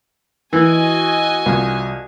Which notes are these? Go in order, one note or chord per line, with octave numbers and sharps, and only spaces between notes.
E3 F#4 D#5 G#5
C2 F4